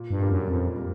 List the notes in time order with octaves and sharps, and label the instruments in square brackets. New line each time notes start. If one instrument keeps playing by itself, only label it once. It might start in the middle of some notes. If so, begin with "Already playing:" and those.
Already playing: [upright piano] A#2
[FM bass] G2
[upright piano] G3 A#3
[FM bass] F#2
[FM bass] F2 [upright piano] A#2
[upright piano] G3 A#3